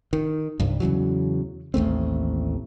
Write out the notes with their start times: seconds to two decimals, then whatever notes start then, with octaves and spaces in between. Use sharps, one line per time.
0.13 D#3
0.60 C2 G2
0.80 E2 C#3 E3 F#3
1.74 A1 D#2 A3 C4